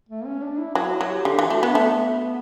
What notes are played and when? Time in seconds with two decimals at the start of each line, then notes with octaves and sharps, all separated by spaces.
0.09 A3
0.26 C#4
0.42 D4
0.59 E4
0.75 F#3 F#4
0.92 E4
1.01 F#3
1.09 G4
1.25 D3 G4
1.39 E3 F#4
1.50 A3
1.59 B3 D4
1.75 A3 B3